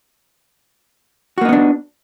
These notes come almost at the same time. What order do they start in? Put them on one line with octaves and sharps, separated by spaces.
F#4 A#3 D#4 B3 D4